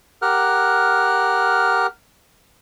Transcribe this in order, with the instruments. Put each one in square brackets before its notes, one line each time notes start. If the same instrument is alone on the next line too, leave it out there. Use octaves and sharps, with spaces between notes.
[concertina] G4 A#4 F#5 F6 F#6